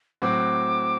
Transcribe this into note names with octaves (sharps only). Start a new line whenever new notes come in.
A2 F#3 C4 F#4 D6